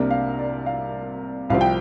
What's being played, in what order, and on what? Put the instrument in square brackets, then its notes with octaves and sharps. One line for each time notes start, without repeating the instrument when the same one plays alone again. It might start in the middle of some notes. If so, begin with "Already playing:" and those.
Already playing: [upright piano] C2 C3 A#3 D4 A#4
F5
D5
F5
C2 C3 F3 C4 F5
G5